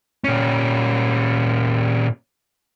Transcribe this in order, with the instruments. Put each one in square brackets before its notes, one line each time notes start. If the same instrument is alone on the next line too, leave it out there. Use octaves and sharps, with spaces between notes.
[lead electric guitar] A#2 C#4